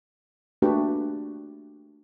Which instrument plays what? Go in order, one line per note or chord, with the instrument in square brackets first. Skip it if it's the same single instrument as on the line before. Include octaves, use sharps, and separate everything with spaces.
[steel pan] A3 A#3 D4 F#4 G4 B4